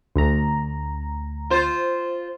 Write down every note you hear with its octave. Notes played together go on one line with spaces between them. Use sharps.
D2 A#5
F4 C5